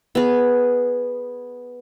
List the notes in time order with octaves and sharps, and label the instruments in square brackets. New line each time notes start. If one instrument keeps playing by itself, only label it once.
[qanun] B3 G#4